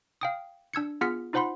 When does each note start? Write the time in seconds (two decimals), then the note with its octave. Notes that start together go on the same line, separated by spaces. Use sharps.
0.21 F5 G5 D#6
0.73 D4 E6 G#6 C#7
1.01 B3 F4 G#4 F6 B6 C#7
1.33 D#4 F4 C5 F#5 B5 C6